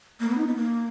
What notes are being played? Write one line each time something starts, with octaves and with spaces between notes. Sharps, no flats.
A#3
B3
D#4
B3
A#3